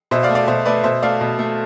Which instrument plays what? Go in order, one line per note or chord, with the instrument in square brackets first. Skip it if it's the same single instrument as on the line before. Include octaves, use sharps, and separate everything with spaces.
[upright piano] B2 C5 E5
D5 F5
A3
D5 F5
B2 C5 E5
A3 B4 D5
B2 C5 E5
A3 D5 F5
B2
A3